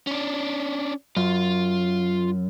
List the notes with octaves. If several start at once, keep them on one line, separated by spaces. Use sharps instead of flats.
C#4 D4
F#2 F4